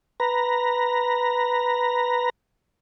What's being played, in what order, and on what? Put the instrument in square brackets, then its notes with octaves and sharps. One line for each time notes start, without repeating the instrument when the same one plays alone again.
[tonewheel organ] B4 A#5